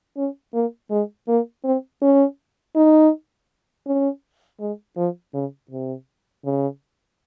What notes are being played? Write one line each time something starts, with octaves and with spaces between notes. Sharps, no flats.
C#4
A#3
G#3
A#3
C4
C#4
D#4
C#4
G#3
F3
C#3
C3
C#3